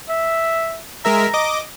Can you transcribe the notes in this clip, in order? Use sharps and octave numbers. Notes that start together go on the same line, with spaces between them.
E5
G#3 A#4 E5 A#5
D#5 D6